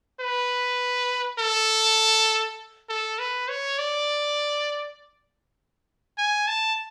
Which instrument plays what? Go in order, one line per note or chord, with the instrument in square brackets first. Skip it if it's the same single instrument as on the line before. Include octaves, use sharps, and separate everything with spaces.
[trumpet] B4
A4
A4
B4
C#5
D5
G#5
A5